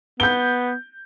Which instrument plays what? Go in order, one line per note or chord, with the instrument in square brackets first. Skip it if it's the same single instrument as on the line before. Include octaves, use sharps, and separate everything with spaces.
[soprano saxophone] B3 [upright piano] G6 G7